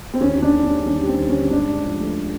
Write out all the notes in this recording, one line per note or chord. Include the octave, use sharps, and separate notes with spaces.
C4
D#2 C#4
D3 C#4
D4
D#2
G3 C#4
D#2 C#4
G3
C4
D#2
C#4
D3
G#2 D4
G#2
F3
A3